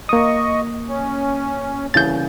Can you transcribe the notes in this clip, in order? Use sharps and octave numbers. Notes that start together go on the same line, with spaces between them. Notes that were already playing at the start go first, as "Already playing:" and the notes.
A#3 D#5 C#6 D#6
C#4
C2 C#3 E3 G6 A6